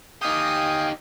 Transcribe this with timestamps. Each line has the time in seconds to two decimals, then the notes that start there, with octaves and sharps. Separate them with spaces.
0.22 D#4 G4 F5 G5 G#5 D#6